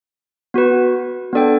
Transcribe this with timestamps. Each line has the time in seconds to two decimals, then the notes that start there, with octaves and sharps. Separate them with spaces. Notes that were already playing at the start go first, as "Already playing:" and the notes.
0.54 B3 F#4 B4
1.33 B3 D4 A4 D5 G5